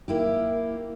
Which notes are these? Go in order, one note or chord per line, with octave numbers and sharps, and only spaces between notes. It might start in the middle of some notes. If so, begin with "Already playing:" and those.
A#3 E4 G4